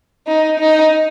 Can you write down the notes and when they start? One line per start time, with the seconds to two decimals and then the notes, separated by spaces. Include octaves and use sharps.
0.27 D#4
0.59 D#4